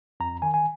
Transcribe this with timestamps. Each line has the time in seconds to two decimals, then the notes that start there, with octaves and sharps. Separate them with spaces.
0.20 F2 A#5
0.42 D#3 G#5
0.54 G#5